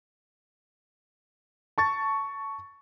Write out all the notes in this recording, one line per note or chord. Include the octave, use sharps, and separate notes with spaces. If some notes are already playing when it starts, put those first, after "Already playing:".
A5 C#6 A6